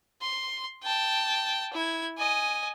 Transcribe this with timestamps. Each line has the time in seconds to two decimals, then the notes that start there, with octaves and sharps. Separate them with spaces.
0.22 C6
0.83 G5 A5
1.73 E4 G#6
2.18 D#5 G#5